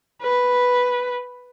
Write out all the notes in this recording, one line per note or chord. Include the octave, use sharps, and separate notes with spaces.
B4